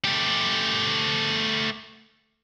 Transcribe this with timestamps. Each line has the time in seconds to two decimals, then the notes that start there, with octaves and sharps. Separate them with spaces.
0.05 A3 G4